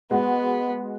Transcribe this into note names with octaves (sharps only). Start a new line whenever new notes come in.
G#3 B3 F#4